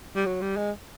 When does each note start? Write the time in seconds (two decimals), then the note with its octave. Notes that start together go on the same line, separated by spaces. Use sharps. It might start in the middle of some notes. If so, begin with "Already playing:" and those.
0.15 G3
0.26 F#3
0.42 G3
0.57 G#3